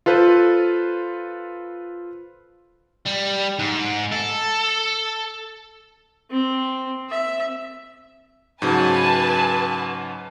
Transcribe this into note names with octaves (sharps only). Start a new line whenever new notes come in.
F4 A4 B4 C5
G3
G#2
A4
C4
E5
G#2 C#3 F#3 B4 G#5 A5